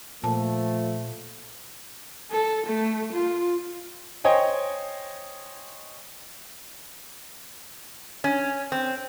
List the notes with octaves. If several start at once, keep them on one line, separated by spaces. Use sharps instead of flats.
A#2 F3 A3 A5
A4
A3
F4
C5 C#5 D#5 G5 G#5
C#4
C4